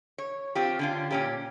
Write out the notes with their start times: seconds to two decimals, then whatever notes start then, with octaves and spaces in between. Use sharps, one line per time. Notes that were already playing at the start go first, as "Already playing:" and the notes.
0.18 C#5
0.55 C4 F4 G4
0.79 D3 C#4 F4
1.11 A#2 C#4 G4